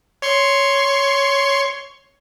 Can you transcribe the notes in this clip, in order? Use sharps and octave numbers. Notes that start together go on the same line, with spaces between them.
C#5 C6 C#6